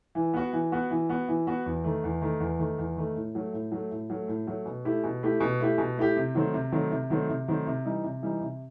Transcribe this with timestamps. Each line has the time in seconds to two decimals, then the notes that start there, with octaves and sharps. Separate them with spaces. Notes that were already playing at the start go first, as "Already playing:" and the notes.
0.15 E3
0.34 B3 F#4
0.53 E3
0.72 B3 F#4
0.91 E3
1.09 B3 F#4
1.28 E3
1.47 B3 F#4
1.66 E2
1.84 D#3 A3
2.04 E2
2.22 D#3 A3
2.40 E2
2.59 D#3 A3
2.78 E2
2.96 D#3 A3
3.16 A2
3.35 F#3 A3
3.53 A2
3.72 F#3 A3
3.91 A2
4.10 F#3 A3
4.28 A2
4.47 F#3 A3
4.66 B2
4.85 A3 E4 G4
5.04 B2
5.23 A3 E4 G4
5.40 B2
5.60 A3 E4 G4
5.78 B2
5.97 A3 E4 G4
6.17 C3
6.35 D#3 F#3 A3 C4
6.54 C3
6.72 D#3 F#3 A3 C4
6.92 C3
7.10 D#3 F#3 A3 C4
7.29 C3
7.48 D#3 F#3 A3 C4
7.67 C3
7.85 E3 G3 D#4
8.04 C3
8.22 E3 G3 D#4
8.41 C3